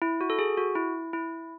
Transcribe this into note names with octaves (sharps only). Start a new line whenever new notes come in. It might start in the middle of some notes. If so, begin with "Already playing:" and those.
E4
F#4
A4
G#4
F#4
E4
E4